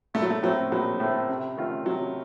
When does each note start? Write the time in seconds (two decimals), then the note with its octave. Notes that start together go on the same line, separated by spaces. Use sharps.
0.14 A#1 A3
0.22 F#3
0.30 A3
0.43 A2 F#3 A3 C4
0.71 A#1 F#3
1.00 A2 A3 C4
1.29 C3
1.57 D#3 A3 C#4 F4
1.86 C3 F#3